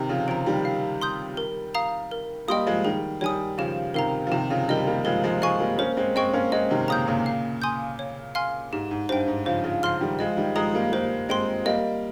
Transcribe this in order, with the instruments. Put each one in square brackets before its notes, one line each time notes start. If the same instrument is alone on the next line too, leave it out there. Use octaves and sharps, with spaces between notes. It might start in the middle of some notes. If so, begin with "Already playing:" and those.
Already playing: [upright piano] C3 D#3
C#3 F3
[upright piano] C#3 F3 [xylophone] G5 A#5
[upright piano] D#3 G3
[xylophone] F5
C6 D#6 G6
A#4
F5 A#5 D#6
A#4
[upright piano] G3 A#3 [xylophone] D#5 G5 C6 D#6
[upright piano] F3 G#3
[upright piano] D#3 G3 [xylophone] G#4
[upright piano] D#3 G3 [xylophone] C#5 G#5 D#6
[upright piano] C#3 F3 [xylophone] G4
[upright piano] C3 D#3 [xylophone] A#4 F5 A#5
[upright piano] F3
[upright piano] C3 D#3 [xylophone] G4
[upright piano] C#3 F3
[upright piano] D#3 G3 [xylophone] A#4 D#5
[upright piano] G3 A#3
[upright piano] F3 G#3 [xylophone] A#4
[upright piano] F3 G#3
[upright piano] F3 G#3 [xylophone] F5 G#5 C#6
[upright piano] G3 A#3
[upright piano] A#3 C#4 [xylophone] C5
[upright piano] G#3 C4
[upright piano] G#3 C4 [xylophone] D#5 G5 C#6
[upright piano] A#3 C#4
[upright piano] G#3 C4 [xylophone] D#5
[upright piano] C3 D#3
[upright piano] A#2 C#3 [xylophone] A#5 D#6 G6
[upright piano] A#2 C#3
[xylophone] F5
G#5 C6 D#6 G6
C#5
F5 G#5 C6 F6
[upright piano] G#2 [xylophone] G4
[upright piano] G#2
[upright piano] G2 [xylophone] C5 G5
[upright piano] G#2
[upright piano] C#3 F3 [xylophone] C5
[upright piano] C#3 F3
[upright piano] C#3 F3 [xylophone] F5 C6 F6
[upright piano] D#3 G3
[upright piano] F3 G#3 [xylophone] D#5
[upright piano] D#3 G3
[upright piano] F3 G#3 [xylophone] A#5 D#6
[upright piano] G3 A#3
[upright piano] G3 A#3 [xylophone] C5
[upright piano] G#3 C4 [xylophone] G5 C6
[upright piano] G3 A#3 [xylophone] D#5